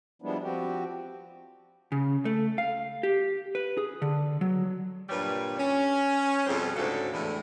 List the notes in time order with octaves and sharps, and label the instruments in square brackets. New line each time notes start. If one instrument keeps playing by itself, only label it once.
[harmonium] F3 G3 G#3 B3 D4 E4
F3 C4 F#4 G4
[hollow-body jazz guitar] C#3
A3
F5
G4
B4
G#4
D3
F#3
[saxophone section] G2 A#2 G3 B4 C#5
C#4
F2 B2 G3 G#4 C5
D2 G#2 C#3 F#4 A4
E2 A2 D3 E3